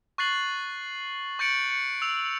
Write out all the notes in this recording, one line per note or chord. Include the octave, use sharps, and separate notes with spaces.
C#6 F#6 A6 C7 F#7
C#6 G6 A6 C#7 D7 F#7
C#7
E6 F7